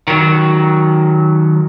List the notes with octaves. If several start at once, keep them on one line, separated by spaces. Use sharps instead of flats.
D#3 F#3